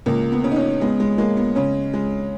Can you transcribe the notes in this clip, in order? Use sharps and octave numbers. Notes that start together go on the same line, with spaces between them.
C#2 A#3
B3
C#3
D#4
C#4
G#3 B3
G#3
G#3 A#3
B3
C#3 C#4
G#3